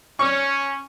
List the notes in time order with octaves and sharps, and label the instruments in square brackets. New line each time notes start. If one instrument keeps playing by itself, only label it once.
[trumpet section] C#4 [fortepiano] C#6